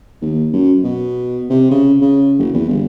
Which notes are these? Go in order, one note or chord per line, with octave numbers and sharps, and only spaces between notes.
D#2
F#2
B2
C3
C#3
C#3
F#1
E2
G1